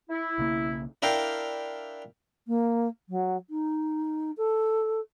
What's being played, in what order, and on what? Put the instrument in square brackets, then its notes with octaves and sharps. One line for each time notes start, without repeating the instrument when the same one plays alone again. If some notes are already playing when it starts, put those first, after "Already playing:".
[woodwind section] E4
[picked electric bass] B1 C#3 A#3
[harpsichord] D4 E4 A#4 F5 G5
[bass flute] A#3
F#3
D#4
A4